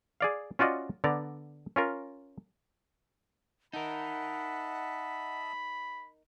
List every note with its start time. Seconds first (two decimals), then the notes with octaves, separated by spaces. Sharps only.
0.21 G#4 D5 F5
0.59 C#4 F4 F#4 D5 D#5
1.04 D3 B3 D5 A#5
1.76 C#4 F4 A#4
3.73 D#4 A#4 D#5 E5 F#5 A5 B5